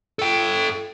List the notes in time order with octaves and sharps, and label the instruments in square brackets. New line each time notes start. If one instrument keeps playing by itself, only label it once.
[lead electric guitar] A4 G5